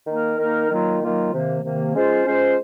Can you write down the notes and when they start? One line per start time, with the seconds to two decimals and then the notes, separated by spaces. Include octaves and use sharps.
0.05 D#3 A#3 D#4 A#4
0.37 D#3 A#3 D#4 A#4
0.68 D#3 F#3 A#3 F4
0.99 D#3 F#3 A#3 F4
1.31 C3 D#3 A#3
1.63 C3 D#3 A#3
1.94 G#3 C#4 F4 C5
2.25 G#3 C#4 F4 C5